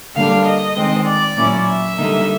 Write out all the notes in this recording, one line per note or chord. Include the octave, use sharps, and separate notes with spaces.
D3 G3 A#3 D4 F5
D#5
D#3 G#3 C4
D5
A#2 F#3 A#3 C#4 E4
E5
D3 G3 A#3 D#4